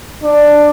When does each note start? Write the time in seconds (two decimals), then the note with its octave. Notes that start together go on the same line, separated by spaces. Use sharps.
0.23 D4